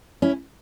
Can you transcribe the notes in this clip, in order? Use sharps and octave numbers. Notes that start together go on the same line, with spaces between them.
C#4 E4